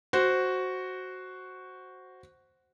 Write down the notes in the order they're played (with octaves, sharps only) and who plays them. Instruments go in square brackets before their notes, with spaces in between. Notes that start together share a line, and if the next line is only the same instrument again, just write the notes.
[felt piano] F#4 C5